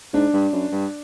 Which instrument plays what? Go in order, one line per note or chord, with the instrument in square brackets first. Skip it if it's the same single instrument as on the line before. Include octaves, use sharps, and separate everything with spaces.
[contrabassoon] G#2 [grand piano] D4
[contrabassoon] G2
F#2
G2